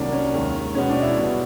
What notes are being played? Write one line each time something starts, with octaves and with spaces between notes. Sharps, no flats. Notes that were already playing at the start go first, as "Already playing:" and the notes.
Already playing: C2 C3 D#3 F#3 A#3 D4
C#4
D#2 D#3 G#3
B2 G#3 B3 C#4
D4
E4
B2 G3 B3